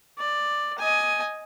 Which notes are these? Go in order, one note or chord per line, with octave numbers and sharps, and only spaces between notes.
D5
D#5 G#5